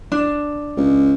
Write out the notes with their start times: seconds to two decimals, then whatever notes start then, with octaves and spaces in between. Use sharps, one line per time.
0.12 D4
0.77 C#2